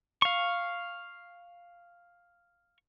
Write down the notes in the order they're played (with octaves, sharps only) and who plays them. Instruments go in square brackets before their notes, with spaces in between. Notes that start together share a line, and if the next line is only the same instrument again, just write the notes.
[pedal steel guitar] F5 C#6